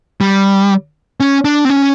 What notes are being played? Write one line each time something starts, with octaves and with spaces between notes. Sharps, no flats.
G3
C#4
D4
C4
C#4